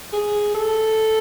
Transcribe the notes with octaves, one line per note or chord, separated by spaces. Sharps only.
G#4
A4